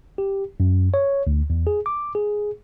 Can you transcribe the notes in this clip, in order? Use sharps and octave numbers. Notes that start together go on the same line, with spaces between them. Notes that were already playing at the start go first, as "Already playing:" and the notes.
G4
F#2
C#5
D2
E2
G#4
D6
G#4